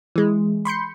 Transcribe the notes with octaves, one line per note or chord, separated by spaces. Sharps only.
E3 G#3
B5 C6 G6 C#7